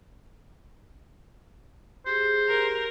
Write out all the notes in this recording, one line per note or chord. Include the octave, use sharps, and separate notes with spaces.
G4 G#4 C5
A#4